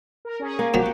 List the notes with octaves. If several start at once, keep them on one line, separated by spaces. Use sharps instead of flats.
A#4
C#4 G#4
A#3
A#2 F3 F#3 F#4 G4